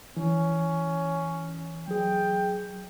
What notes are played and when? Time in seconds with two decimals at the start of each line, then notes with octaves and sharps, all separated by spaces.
0.17 E3 C#4
1.88 F#3 G#4 G5